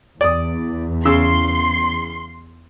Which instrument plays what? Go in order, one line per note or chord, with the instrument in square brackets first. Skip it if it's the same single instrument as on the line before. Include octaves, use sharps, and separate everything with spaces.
[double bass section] E2 [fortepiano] D5 D#6
[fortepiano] C#3 E6 [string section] C6